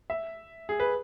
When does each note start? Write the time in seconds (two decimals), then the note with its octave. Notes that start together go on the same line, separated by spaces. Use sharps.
0.10 E5
0.69 G#4
0.80 B4